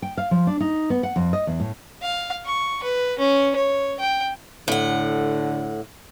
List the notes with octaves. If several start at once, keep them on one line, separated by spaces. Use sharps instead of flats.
G5
F5
F3
D4
D#4
B3
F#5
F2
D#5
E2
A2
F5
C#6
B4
C#4
C#5
G5
A2 D3 F#5